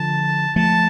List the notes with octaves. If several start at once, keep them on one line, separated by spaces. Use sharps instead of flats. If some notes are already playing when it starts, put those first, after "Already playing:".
Already playing: D3 F3 A5
F3 A3 A5